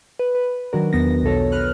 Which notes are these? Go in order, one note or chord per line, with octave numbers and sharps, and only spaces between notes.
B4
B4
D#3 F#3 D4 F#4 A#4
E2 B3 A#6
B1 B2 F3 A4 C#5
B4 F6 F#6